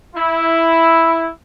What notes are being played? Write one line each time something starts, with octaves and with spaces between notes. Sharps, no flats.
E4